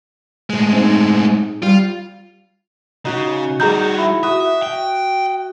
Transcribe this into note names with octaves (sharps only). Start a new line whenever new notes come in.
A2 G#3
C4 D#4
G3 F4
C#3 D#4 F#4
G3 D#4 F#4 G#4 A#5 G6
E4
F#4 E5 D#6
G5